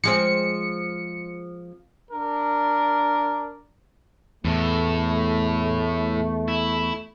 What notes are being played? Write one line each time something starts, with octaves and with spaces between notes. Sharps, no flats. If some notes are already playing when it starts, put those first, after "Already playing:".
F3 G#3 C4 C#7
D4 A#4
E2 A2 A3 A4
E4